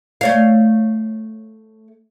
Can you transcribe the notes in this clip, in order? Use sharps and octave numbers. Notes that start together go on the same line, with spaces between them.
A3 C#5 F5